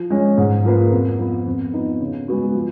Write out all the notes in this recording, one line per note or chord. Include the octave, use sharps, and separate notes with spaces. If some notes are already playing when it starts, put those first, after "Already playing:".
Already playing: F3
G#3 C#4
G#2
F3 A#3 F4 B4
F2
F3 B3
F2
F3 B3 D#4
C#3
G#3 B3 F#4
F3